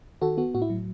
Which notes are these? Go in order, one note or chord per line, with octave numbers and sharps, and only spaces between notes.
D#3 F#4 A4
B3 F#4
A2 F#4
E4
F#3